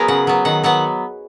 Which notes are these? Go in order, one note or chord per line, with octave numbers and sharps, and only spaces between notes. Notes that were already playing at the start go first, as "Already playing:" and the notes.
Already playing: F#3 B3 G#4 A#4
C#3 F#5
F#3 B3
D#3 F#5
F#3 B3 F#5